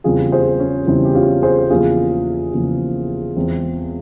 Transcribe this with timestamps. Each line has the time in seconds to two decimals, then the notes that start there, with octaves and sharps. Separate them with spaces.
0.04 E2 C#3 G3 C4 F4 G#4
0.32 G#4 C5
0.60 C#4
0.87 E2 C#3 G3 C4 E4
1.05 G4
1.15 C#4 F4
1.42 G#4 C5
1.70 E2 C#3 F3 A#3 F4 G#4
2.53 E2 C#3 F3 A#3
3.36 E2 E3 G#3 C4